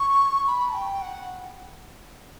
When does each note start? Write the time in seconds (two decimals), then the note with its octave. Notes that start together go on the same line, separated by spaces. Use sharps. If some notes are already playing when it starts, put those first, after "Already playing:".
Already playing: C#6
0.47 B5
0.69 A5
0.74 G5
1.02 F#5